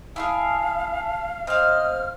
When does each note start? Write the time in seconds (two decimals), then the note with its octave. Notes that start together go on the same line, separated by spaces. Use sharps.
0.16 E4 F4 G#4 F5 A5
1.47 C4 C5 D#5 F5 F6